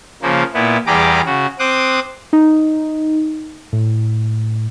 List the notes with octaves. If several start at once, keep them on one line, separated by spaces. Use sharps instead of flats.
C#3 F3 A#3
A#2 B3 E4
E2 G3 G4 G#4 A#5 D6
C#3 F#4
C4 C5 D6 D#6 F#6
D#4
A2